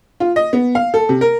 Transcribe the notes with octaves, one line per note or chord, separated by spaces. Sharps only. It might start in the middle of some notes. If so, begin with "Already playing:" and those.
F4
D#5
B3
F5
A4
C3
A#4